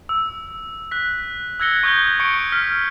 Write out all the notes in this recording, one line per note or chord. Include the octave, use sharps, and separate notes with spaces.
E6
F#6 B6
E6 F#6 G#6 A#6 C#7 G7
C#6 D#6 G6 G#6 G7
C#6 C#7 D7 G7
F6 B6